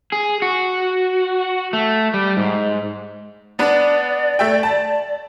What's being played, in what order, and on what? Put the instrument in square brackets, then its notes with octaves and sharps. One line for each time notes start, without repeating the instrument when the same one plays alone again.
[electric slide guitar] G#4
F#4
A3
G3
G#2
[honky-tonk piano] B3 D4 B4 [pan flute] D5
[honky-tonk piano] A3 E5 G5
A5